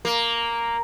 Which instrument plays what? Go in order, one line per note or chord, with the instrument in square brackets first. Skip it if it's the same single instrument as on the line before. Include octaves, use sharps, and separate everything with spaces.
[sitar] A#3